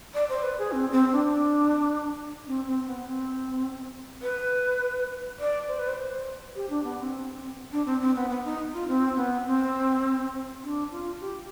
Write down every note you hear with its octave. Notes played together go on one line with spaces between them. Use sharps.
D5
C5
B4
G#4
C4
C4
D4
C4
C4
B3
C4
B4
D5
C5
B4
C5
G4
D4
B3
C4
D4
C4
C4
B3
B3
D#4
F4
C4
B3
C4
D4
F4
G4